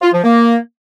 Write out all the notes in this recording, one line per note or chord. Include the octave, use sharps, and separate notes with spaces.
F4
F3
A#3